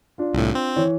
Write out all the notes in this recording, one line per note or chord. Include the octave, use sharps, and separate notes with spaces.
D4 F4
C2 A2
C4
E3 C#5